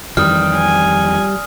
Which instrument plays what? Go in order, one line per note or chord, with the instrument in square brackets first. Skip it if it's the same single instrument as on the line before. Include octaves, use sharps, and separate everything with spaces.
[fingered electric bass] F2 D#3 E3 [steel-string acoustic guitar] G3 [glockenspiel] D#6 F6
[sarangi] G#5